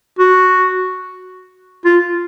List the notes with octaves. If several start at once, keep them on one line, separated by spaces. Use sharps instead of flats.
F#4
F4